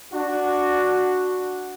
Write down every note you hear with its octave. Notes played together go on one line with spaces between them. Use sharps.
D4 F#4